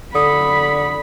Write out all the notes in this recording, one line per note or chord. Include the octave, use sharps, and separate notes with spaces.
D3 B5 D#6